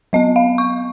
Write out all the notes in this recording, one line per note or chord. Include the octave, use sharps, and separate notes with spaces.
F#3 B3 D#5
F5
C#6